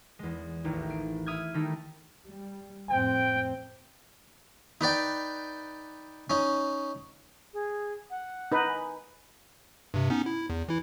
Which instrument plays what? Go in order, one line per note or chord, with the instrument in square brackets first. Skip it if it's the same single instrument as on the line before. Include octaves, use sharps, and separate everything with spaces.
[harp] E2 G#3
A1 D#2 A2 E3
C7 D7
E4 D#6 F6 G#6
D#3 G3 A3 D#4 E4 A4
[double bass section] G3
[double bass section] F2 A2 C4 [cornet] G5
[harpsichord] D#4 B4 D5 G5
C#4 D#4
[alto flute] G#4
F#5
[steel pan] D#4 B4
[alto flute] G#5
[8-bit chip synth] G2 C3
B3 C#4 D#4
E4
E2
E3 E4